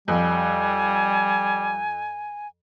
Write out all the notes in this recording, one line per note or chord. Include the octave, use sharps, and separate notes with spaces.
F2 G3 G#5